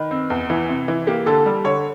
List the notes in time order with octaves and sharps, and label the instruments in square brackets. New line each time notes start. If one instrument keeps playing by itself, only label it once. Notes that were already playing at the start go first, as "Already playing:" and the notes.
Already playing: [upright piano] D#3 B4
C4
E2
E3
C3
E3
A#3 G4
D3 A4
G3
D3 C#5